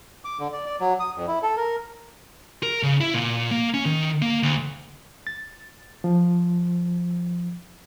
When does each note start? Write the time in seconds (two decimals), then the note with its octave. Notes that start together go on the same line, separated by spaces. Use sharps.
0.25 D6
0.40 D3
0.53 D5
0.66 D5
0.80 F#3
1.00 D#6
1.16 F2
1.28 E4
1.43 A4
1.57 A#4
2.63 A#4
2.83 C#3
3.01 E4
3.14 A#2
3.51 A#3
3.74 C#4
3.86 D#3
4.22 A#3
4.43 D2
5.27 A6
6.04 F3